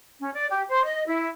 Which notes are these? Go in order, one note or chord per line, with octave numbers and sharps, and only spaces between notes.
C#4
D5
G4
C5
D#5
E4